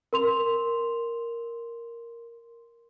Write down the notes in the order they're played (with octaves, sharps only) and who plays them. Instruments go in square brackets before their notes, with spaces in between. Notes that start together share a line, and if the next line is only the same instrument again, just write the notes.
[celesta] A#4 C6 F7